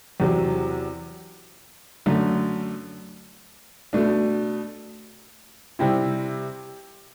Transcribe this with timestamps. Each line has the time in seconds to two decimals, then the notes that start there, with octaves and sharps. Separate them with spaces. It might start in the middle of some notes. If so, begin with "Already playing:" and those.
0.20 E2 C3 F#3
2.06 F#2 D3 A3
3.93 B2 A3 D4
5.79 C3 G3 C4 E4